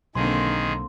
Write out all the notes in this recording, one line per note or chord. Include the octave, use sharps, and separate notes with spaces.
B1 D3 D#3 A#3 C4 G#4 C6